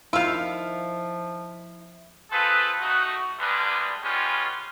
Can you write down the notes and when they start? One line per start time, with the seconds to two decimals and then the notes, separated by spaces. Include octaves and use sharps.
0.13 D#3 F3 E4 F4 F5 E6
2.31 C4 F4 G#4 A4 B4
2.80 A3 D#4 F#4
3.39 D2 G3 G#3 D4 B4
4.02 G#3 B3 C#4 F4 G4